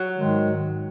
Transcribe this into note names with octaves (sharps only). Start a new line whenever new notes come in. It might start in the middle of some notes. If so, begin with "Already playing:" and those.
Already playing: F#3
G#2 D#3 G#3